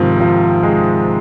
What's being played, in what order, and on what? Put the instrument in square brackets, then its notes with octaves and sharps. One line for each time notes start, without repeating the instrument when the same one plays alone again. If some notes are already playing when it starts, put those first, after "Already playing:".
Already playing: [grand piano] G#2 F3 [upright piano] C3 D#3
[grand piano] F3
G#3